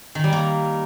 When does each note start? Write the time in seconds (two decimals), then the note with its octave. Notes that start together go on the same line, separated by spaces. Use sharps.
0.15 D#3
0.24 G3
0.33 A#3